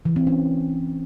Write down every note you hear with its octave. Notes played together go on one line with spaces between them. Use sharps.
E3
C4
C#4